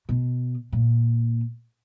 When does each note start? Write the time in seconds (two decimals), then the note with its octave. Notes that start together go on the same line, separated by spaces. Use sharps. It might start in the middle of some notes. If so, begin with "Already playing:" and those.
0.09 B2
0.72 A#2